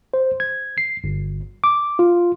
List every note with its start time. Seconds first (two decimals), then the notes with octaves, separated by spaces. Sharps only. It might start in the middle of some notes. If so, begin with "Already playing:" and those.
0.14 C5
0.40 G#6
0.78 C7
1.04 G1
1.64 D6
1.99 F4